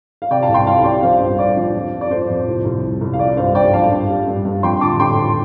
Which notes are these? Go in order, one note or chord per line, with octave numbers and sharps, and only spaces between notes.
F5
C3 D5 G5
F5 A5
C2
G5 C6
C2 F5 A5
G3 D5 G5
F3 C5 F5
G2
F3 D5
F3
F2
F3
D5
F3 C5
F2
C2
C2
C2
C2
F5
F3 D5
G2 C5 F5
G2 D5 G5
F3 F5 A5
G2
G3
G2
G2
F2 G5 C6
D3 A5 D6
D3 G5 C6
F3